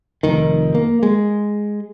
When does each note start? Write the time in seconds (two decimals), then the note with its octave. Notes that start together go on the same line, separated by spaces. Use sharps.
0.23 F1 D#3
0.75 A#3
1.03 G#3